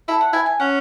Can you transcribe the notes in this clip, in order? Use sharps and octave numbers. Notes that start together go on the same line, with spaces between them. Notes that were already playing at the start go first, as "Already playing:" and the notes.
E4 A4
F#5
E4 G#5
G#5
C#4 F#5